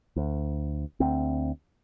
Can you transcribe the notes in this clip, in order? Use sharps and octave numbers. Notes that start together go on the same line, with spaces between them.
D2
D2 C4